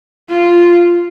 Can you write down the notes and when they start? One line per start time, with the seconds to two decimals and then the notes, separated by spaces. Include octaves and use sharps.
0.29 F4